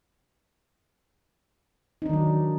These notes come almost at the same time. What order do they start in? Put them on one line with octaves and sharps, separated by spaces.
D#4 D4 D#3 F#3